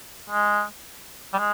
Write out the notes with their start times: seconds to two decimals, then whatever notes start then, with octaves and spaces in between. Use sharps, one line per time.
0.30 G#3
1.33 G3
1.38 G#3